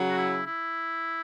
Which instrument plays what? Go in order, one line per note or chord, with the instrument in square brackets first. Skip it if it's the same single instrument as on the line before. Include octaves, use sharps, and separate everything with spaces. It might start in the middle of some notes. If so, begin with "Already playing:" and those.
Already playing: [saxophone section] C#3 F#3
[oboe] F#4
E4
E4